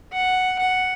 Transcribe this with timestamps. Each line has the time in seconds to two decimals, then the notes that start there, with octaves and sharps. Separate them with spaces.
0.13 F#5
0.59 F#5